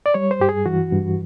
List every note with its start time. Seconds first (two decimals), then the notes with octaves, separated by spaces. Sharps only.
0.06 D5
0.14 G3 C#5
0.31 C5
0.40 G2 G4
0.49 G#4
0.66 E3 F#4
0.92 G2